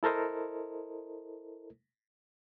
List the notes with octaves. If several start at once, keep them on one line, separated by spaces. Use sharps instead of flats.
E4 A4 A#4 C5 D#5